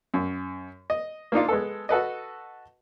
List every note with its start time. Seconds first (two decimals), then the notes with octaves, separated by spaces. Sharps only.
0.14 F#2
0.90 D#5
1.32 A#3 D4 D#4 F4
1.48 G#3 B3 A4
1.89 F#4 A4 B4 D#5